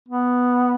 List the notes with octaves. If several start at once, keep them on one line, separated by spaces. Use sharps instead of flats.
B3